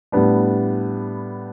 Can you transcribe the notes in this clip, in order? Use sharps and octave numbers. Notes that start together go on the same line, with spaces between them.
A2 G3 B3 D4